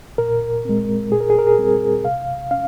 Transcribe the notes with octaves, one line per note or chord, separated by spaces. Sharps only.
A#2 A#4
G#3 C4
A#2 G#4
A#4
G#4
A#4
G#4
G3 C4
C3 F5
C#4 F5